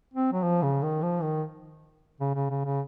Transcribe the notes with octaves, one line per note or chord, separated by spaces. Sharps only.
C4
F#3
F3
C#3
D#3
F3
D#3
C#3
C#3
C#3
C#3